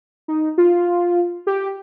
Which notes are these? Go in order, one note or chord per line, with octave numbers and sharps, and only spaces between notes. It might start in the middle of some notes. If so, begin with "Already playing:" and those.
D#4
F4
G4